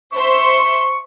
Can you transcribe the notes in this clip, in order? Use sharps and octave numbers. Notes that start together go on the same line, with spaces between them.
C5 E5 C6 C#6